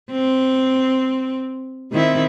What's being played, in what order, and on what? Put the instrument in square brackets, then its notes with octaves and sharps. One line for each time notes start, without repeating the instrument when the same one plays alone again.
[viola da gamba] C4
D#3 C4 E4